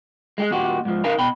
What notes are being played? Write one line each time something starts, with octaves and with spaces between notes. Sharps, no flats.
G#3 G4 G#4
D#2 A#2 F#4 G4
G#2 F3
C#3 D#4 A#4 F5 G#5 A#5
B2 G5 B5